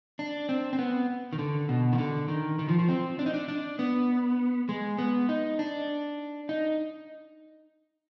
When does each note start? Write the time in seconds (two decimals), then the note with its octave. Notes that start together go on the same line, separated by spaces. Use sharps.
0.19 D4
0.49 C4
0.73 C4
0.79 B3
1.33 D#3
1.39 D3
1.69 B2
1.93 D#3
1.98 D3
2.28 D#3
2.59 D#3
2.69 F3
2.79 F3
2.88 C4
3.19 D4
3.26 D#4
3.34 D4
3.48 D4
3.79 B3
4.69 G#3
4.98 B3
5.29 D#4
5.59 D4
6.49 D#4